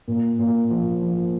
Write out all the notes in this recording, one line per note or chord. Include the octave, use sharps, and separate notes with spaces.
A#2
A#2
F3
F3